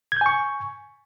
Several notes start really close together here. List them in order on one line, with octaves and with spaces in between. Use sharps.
G#6 G6 G#5 C#6